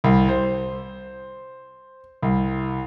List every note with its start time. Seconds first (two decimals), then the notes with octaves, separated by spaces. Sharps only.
0.04 C2
0.29 C5
2.22 C2